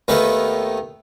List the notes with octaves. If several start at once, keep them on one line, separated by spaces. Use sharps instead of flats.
D#2 D#3 A3 B3 B4